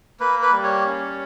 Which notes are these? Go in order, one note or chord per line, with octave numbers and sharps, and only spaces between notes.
A#3 B4
B4
G3
C#5
C#4